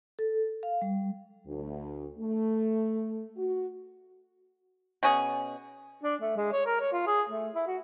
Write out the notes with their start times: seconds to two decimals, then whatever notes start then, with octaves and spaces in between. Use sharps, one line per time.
0.19 A4
0.63 F5
0.82 G3
1.45 D2
2.18 A3
3.36 F#4
5.03 B2 C#4 G#4
6.03 D4
6.21 A3
6.37 G#3
6.52 C#5
6.66 A#4
6.80 C#5
6.93 F4
7.06 G#4
7.30 A3
7.55 E4
7.67 F#4